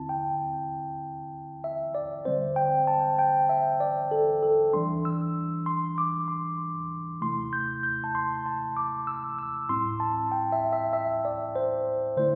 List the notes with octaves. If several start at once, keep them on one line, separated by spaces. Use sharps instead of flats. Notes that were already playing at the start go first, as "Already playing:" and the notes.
Already playing: D3 C4 E4 A5
G5
E5
D5
D3 G3 C4 C5
G5
A5
G5
E5
D5
A4
A4
E3 G3 D4 C6
E6
C6
D6
C6
C3 A3 E4 C6
G6
G6
A5
C6
A5
D6
E6
E6
A2 G3 C4 E4 C6
A5
G5
E5
E5
E5
D5
C5
D3 A3 E4 C5